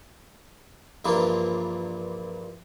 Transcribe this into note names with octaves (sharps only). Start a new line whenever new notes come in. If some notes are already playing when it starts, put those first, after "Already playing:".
A#1 G2 E3 F3 G3 A#3